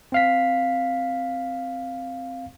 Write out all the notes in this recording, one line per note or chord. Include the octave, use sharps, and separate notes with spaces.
C4 F5 B6